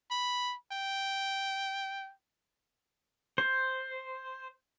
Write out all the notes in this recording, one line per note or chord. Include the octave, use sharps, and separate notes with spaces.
B5
G5
C5